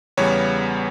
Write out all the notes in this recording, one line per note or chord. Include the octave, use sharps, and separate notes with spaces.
E2 C#3 G3 B3 C#5